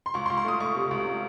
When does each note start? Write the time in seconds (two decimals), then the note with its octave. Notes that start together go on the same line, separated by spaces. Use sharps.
0.06 C6
0.14 C#2 C#6
0.26 C6
0.30 C#2
0.37 C6
0.45 A3 D#6
0.60 A3 C#6
0.76 C3
0.91 C#2